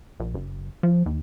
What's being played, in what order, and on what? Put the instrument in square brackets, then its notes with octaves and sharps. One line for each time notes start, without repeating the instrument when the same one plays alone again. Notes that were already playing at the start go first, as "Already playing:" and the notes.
[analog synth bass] A#1
F#1
F3
D#2